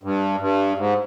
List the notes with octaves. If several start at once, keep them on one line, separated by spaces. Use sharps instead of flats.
G2
G2
G#2